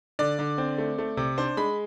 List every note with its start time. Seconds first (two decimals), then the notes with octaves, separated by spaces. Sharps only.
0.19 D3 D5
0.39 D3
0.58 C4
0.78 A3
0.98 A3
1.17 C3
1.38 D4 C5
1.57 G#3 B5